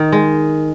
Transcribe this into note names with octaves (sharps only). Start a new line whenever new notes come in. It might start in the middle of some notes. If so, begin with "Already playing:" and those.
Already playing: D#3
G#3